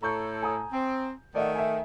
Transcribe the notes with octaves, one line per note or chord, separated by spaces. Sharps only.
A2 A4 A#5 C#6 G6
G#5 A#5 D#6
C4
D#3 A3 D5 D#5 F#5
E5 G#5